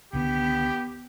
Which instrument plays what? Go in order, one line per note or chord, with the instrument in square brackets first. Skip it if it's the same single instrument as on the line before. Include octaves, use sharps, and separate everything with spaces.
[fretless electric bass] C#2 D3 D#3 [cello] B3 [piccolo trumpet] G4